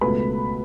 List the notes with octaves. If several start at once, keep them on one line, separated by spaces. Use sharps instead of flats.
C#2 B2 A3 B4 B5